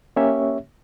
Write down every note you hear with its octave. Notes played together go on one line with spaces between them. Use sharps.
A#3 C#4 G4 C#5 E5